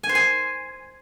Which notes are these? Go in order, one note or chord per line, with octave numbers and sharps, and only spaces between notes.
G#5
C5
G#5